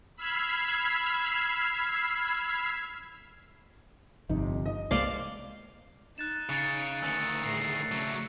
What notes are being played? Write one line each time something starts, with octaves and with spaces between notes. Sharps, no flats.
B5 E6 F6 G#6 C7
G1 F2 C3 D#4
D#5
C2 G#3 A#3 C5 D5 F5
D#4 F#6 A6 E7
C#3 A6 C#7
D2 D#3 E6 C#7
A2 G#4 A#6 C7
C#3 F#3 A3